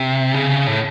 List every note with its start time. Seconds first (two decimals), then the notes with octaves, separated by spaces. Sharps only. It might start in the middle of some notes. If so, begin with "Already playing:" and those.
Already playing: C3
0.34 C#3
0.67 A2